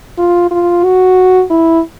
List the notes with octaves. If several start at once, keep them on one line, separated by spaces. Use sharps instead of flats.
F4
F4
F#4
E4